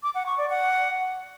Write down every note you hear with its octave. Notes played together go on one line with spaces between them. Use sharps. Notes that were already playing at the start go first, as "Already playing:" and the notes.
D6
F#5
C#6
D5
F#5